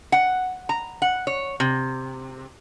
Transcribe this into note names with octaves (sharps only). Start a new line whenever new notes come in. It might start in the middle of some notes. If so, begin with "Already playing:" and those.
F#5
A#5
F#5
C#5
C3